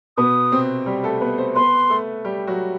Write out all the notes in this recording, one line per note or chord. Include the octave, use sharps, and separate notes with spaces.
B2 B3 D#6
C3 C4
G3 G4
A3 A4
B3 B4
C4 C5
B3 B4 C6
A3 A4
G3 G4
F#3 F#4